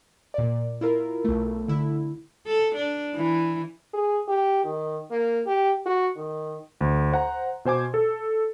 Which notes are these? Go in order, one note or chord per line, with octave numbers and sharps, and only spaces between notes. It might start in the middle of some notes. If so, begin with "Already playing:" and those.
A#2 D5
E4 F4 A#4
B1 A3
D3 E4
A4
D4
E3
G#4
G4
D#3
A#3
G4
F#4
D#3
D2
C5 F#5 A#5
B2 C5 G#5 D6
A4